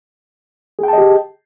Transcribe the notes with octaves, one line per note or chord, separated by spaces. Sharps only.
G4 G#4 D#5 G5 A5